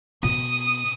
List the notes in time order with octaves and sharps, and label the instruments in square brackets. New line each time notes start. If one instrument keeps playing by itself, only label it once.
[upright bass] B2 [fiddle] D#6